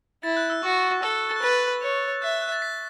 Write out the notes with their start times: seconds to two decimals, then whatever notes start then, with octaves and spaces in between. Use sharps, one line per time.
0.23 E4 A6
0.37 F#6
0.50 E6
0.63 F#4 C#6
1.03 A4 E6
1.29 A6
1.36 F#6
1.42 B4 A6
1.82 C#5
2.22 E5 F#6
2.42 F#6
2.52 A6
2.62 B6